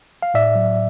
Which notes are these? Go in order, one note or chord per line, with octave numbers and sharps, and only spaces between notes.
F5
A2 D5 E5
F#3